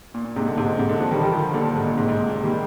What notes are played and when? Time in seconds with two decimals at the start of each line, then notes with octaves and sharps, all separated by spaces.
0.14 A#2
0.25 A#2
0.36 G#2 C3
0.47 A#2 D3
0.57 G#2 C3
0.68 A#2
0.78 G#2 C3
0.89 A#2 D3
1.00 D3 F3
1.11 D#3 G3
1.21 D#3 G3
1.33 D3 F3
1.54 A#2 D3
1.65 A#2
1.75 G#2
1.87 A#2
1.97 G#2 C3
2.08 G#2
2.18 A#2
2.29 A#2
2.44 D#3 G3